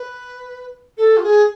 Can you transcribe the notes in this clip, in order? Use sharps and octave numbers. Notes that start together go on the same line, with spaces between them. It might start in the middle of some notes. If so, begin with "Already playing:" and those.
Already playing: B4
A4
F4
G#4